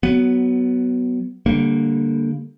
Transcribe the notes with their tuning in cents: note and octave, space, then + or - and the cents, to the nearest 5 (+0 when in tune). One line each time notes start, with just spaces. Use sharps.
F#3 +20 B3 +0
D3 +0 G3 +20 A#3 +0